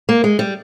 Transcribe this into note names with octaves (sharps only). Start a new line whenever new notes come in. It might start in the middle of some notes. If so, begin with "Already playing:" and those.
A#3
G#3
G3